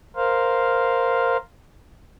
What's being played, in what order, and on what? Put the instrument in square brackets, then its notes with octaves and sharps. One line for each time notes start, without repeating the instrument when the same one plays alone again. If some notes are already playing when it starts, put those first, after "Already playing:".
[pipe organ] A#4 C5 F5